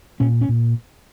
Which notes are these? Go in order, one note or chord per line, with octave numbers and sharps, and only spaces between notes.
A#2 C#4
C#4
A#2